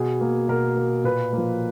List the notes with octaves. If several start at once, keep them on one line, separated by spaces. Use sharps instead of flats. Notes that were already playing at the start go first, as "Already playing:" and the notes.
Already playing: B2 G#4
A#3
B2 A#4
A#3
A#2 B4
F3 A#3